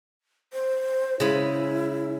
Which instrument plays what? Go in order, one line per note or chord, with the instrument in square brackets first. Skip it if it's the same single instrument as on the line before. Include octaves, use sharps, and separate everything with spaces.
[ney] C5
[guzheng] C#3 G#3 B5 [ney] E4